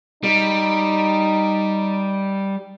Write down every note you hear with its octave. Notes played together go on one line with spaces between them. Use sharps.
G3 D#4